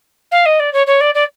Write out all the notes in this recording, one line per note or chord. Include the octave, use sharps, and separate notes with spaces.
F5
D#5
D5
C#5
C#5
D5
D5